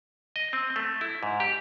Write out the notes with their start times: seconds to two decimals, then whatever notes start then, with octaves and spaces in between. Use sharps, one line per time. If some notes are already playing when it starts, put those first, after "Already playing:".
0.36 D#5
0.53 C4
0.76 A3
1.01 E4
1.23 G#2
1.40 G4